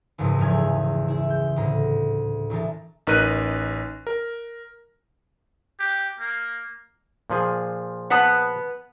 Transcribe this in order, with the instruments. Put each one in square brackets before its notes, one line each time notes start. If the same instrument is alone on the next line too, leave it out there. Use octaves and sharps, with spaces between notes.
[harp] F#1 C#2 G#2 F3 F#3
F1 E2 F5 G#5 G#6
E4 G#4
G6
D2 A2 A#5
A#1 E3 A#4 A5
[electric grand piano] A1 D#4 A#4 B4 F#6 D#7
A#4
[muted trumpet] G4
A#3
[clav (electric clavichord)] A#2 F3 G#4
[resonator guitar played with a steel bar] B3 B4 A5 [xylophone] F#5 D#6